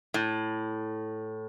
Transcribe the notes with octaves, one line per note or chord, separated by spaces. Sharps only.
A2